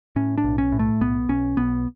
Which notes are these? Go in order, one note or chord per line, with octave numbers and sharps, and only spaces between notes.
A2 C#4
D4
B1
C#4
A2
A3
B1 B3
B1 C#4
B1 B3